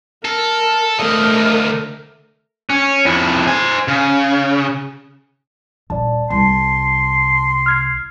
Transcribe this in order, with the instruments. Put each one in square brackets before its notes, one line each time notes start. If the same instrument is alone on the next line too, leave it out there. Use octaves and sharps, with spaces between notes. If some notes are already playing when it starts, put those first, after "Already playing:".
[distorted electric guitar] A4 [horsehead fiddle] A#4
[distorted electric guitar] D2 D#5 [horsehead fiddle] A3 A#4
[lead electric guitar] C#4
F2 E4
C5 G#5
C#3
[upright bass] D#1 [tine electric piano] D5 A5
[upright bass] C2 [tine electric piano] A5 [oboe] C6
[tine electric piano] F6 G#6 C7